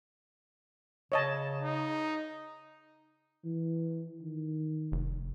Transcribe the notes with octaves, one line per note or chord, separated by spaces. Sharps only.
C#3 C#5 D#5 A5
D#4
E3
D#3
F1